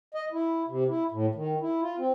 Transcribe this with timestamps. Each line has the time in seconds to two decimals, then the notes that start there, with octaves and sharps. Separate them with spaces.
0.14 D#5
0.32 E4
0.68 C3
0.88 E4
1.11 A2
1.35 D#3
1.60 E4
1.82 F4
1.98 C4